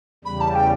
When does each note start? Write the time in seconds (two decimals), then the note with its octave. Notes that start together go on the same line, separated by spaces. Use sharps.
0.24 E2 C#3 G3 B5
0.40 A5
0.55 G5